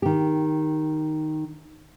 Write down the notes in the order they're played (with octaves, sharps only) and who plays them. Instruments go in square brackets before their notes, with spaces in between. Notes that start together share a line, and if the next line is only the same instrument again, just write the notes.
[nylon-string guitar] D#3 G4